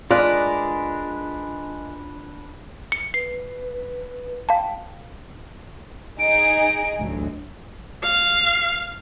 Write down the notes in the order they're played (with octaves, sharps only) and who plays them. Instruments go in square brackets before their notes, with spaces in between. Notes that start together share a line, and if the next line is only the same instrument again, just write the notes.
[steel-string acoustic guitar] G#3 [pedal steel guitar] D4 A#4 B4 [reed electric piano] F4 [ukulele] D5
[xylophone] C#7
[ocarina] B4 [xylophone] C7
[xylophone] F5 A5 [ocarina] G5
[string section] D#4 G#4 [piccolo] D7
[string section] A1 D2 F#3
[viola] F5